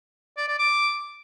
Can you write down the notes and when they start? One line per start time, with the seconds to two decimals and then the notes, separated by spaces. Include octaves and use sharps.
0.38 D5
0.48 D5
0.59 D6